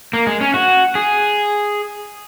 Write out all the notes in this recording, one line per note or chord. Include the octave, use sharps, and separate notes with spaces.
A#3
G#3
C#4
F#4
G#4